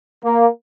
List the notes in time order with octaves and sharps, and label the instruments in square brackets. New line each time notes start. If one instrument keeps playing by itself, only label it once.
[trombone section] A#3